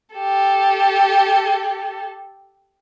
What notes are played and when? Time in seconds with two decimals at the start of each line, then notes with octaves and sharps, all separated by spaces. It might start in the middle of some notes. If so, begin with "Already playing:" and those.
0.15 G4 A4